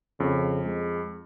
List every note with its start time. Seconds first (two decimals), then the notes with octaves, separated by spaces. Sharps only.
0.20 F2 C#3
0.65 G#3